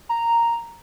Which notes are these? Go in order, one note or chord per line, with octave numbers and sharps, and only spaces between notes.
A#5